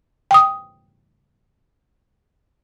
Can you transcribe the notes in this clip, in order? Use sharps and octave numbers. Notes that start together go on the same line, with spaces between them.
G5 D#6